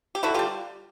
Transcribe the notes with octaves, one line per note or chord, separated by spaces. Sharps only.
G4
D3 E4 F#4
G3 F4 G4